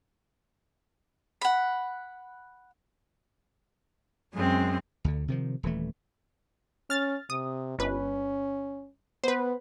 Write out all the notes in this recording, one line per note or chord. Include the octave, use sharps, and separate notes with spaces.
F#5 B5
F#2 G#3 C4
D2 D3
C3 D#3 F3
D#1 E3 A3
C#4 F6 A6
C3 D#6
G1 C#4 B4
B3 B4 C5